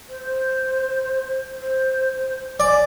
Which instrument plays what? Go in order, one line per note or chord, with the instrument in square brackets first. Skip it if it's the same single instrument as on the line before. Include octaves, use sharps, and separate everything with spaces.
[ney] C5
C5
[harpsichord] D5 [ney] G#5